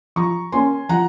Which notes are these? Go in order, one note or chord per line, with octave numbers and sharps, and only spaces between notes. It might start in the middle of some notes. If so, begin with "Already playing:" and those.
F3 A#5 C#6
A#3 C#4 G#5 C6
F3 F#5 A#5